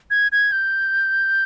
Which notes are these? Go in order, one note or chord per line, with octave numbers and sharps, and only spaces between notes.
G#6
G#6
G6